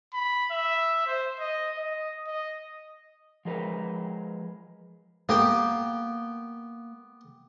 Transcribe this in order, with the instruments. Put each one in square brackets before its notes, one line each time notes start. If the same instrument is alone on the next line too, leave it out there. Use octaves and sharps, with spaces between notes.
[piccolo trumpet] B5
E5
C5
D#5
D#5
D#5
[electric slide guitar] F3 G#3 A#4 B4
[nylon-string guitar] A#3 [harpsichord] B3 G4 G5